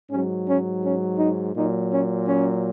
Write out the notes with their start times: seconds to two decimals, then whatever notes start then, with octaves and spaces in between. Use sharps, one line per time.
0.10 G#2 F#3 C#4
0.47 C#4
0.83 C#4
1.19 D#4
1.55 A#2 F#3 D#4
1.92 C#4
2.28 C#4